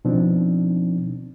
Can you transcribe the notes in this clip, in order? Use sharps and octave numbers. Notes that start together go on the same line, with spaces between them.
B2 F3 C4 D4 D#4